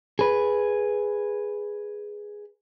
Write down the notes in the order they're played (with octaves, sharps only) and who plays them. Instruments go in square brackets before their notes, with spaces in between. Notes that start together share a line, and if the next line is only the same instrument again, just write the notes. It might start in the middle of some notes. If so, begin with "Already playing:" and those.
[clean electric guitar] G#4 B4